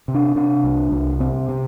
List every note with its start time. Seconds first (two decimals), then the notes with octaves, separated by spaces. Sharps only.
0.08 C3
0.14 D4
0.35 C3 D4
0.64 C2
0.92 C2
1.20 C3 C4
1.49 C3